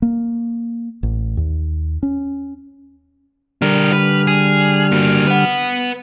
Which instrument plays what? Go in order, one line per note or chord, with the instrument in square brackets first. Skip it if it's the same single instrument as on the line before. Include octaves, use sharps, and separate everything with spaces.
[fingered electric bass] A#3
A1
D#2
C#4
[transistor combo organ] D3 G3 F6 [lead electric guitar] D4 A#4
[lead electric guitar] B4
G#4
A#3 F#4
B4 F#5